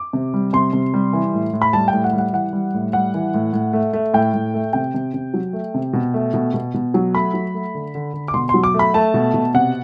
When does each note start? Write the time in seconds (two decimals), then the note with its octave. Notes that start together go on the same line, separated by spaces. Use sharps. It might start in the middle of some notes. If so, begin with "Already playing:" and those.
Already playing: D6
0.13 C3
0.34 G3
0.53 C3 C6
0.73 C3
0.94 G3
1.13 E3
1.34 A2
1.53 A2
1.62 B5
1.73 G3 A5
1.88 G5
1.93 A2
2.04 F#5
2.13 G3
2.18 F#5
2.33 E3 F#5
2.53 G3
2.74 A2
2.93 G3 F#5
3.14 E3
3.34 A2
3.53 A2
3.73 A3
3.93 A3
4.13 A2 G5
4.34 A2
4.54 A3
4.73 C3 G5
4.94 C3
5.14 C3
5.34 F#3
5.53 A3
5.74 C3
5.93 B2
6.14 A3
6.34 B2
6.54 B2
6.74 B2
6.94 F#3
7.14 A3 B5
7.34 F#3
7.54 A3
7.75 D3
7.95 D3
8.14 D3
8.28 D6
8.34 B2 C6
8.49 F#3 C6
8.64 D6
8.74 A3
8.79 B5
8.94 A3 A5
9.14 B2
9.34 B2
9.54 C3 F#5